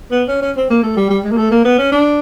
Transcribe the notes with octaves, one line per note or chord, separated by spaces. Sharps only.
B3
C#4
C#4
C4
A#3
A3
G3
G3
G#3
A#3
A3
A#3
B3
C#4
D4